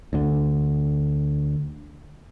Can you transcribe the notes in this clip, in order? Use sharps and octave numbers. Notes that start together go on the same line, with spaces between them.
D2 D3